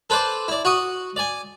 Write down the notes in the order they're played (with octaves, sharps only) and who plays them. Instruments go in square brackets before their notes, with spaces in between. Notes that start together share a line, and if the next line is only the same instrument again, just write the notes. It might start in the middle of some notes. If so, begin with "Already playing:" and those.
[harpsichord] A4 B4 C5 D5
E4 D5
F#4 F#5 D#6
D5 G#5